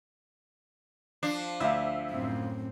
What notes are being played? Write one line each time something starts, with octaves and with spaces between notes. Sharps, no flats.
F3 D4 C7
D2 E5 F5
F#2 A2 C4